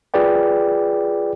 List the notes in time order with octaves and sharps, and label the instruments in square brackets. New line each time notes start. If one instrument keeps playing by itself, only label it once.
[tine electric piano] F4 G#4 B4 D5 G5